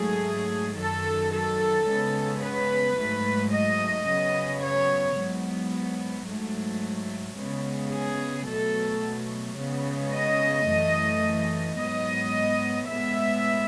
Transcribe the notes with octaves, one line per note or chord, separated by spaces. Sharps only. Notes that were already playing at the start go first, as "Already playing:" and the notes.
Already playing: G#2 F#3 A3 G#4
F#2 D#3 F#3 A4
A4
C#3 G#3 B3
B4
G#2 F#3 A3
D#5
C#3 F#3 B3
C#5
G#2 F#3 B3
G#2 F#3 A3
C#3 G#3 B3
G#4
B2 F#3 A3 A4
C#3 G#3 B3
D#5
F#2 E3 A3
G#2 F#3 B3 D#5
A2 G#3 B3 E5